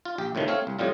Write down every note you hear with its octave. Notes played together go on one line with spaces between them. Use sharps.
F4
A#1 G4
D2 A2 C3 D#3 F3
A3 C4 C#5 F5
C2
F2 A2 G3 F4